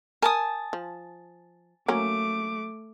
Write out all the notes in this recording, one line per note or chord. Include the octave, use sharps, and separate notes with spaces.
A#4 G#5 A5 D#6
F3
F#3 A3 A#3 C#4 D6